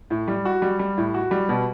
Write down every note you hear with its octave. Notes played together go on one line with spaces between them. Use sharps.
A2
G3
F#4
G3
G3
A2
F#4
G3
B2